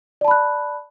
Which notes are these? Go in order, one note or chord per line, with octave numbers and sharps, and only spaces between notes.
D5 A5 B5 F#6